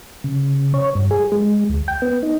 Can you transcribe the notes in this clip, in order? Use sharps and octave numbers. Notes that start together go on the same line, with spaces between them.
C#3
C#5
G2
G#4
G#3
D2
G5
B3
D#4